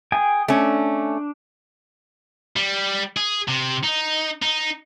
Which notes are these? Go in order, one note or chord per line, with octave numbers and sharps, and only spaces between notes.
G#4 G5 G#5
A3 C#4 D4
G3
G#4
C3
D#4
D#4